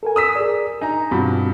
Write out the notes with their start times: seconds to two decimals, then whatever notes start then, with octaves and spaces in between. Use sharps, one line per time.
0.03 A4 A#4 G#5
0.16 D#6 E6 B6
0.36 G#4 A#4 D5
0.81 D#4 G#5 A#5
1.12 G2 B2 C4 F4 B5